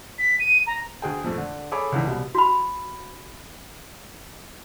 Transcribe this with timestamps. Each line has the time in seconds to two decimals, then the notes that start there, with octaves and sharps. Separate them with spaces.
0.19 B6
0.40 D#7
0.67 A#5
1.02 D2 G#4 G5
1.24 F2 A#2 A3
1.38 D3
1.71 G#4 A4 C#5 G#5 B5 D6
1.92 C#2 D3 E3
2.07 C2 B2 G3
2.35 F#4 B5